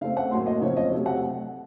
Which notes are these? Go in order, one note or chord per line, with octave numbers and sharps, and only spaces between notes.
C#3 A3 C4 F5
F#5
A2 F#3 A#3 C6
D#5
C#3 F3 C4 C#5
D#5
C3 F#3 A3
F#5